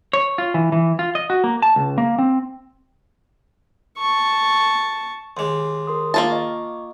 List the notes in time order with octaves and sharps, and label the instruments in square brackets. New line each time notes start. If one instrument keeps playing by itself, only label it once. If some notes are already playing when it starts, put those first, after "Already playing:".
[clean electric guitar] C#5
F4
E3
E3
F4
D#5
F#4
A#3
A5
C#2
A#3
C4
[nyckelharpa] A5 C#6
[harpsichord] D#2 G#3 [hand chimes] C6 D6
[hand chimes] A#4 C6 D#6
[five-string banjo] A#3 F4 A5
[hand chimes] D#5 C#6